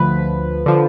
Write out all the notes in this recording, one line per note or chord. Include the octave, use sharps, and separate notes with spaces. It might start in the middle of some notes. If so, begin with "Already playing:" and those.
Already playing: D2 D3 F3 B4
D3 F3